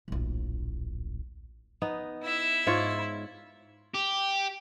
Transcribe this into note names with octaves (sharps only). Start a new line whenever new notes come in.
D1 A#1
B3 D#4
E4 E5
G#2 F4 C#5
G4